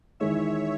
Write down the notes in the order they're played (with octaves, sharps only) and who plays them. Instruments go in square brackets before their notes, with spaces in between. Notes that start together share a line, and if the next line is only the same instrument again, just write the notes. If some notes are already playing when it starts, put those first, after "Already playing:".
[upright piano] E2 D#3 G#3 D#4 [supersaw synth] C#5 E5